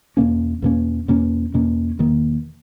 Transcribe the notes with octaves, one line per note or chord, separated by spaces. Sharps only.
E2 B2 A#3 C#4
E2 B2 A#3 C#4
E2 B2 A#3 C#4
E2 B2 A#3 C#4
E1 E2 D#3 A#3